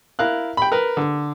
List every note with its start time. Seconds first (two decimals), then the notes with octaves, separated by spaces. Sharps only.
0.19 E4 A#4 F5 F#6
0.57 G5 B5
0.72 A#4 B4
0.97 D3